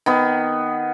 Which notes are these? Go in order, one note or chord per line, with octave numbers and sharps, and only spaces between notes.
D#3 B3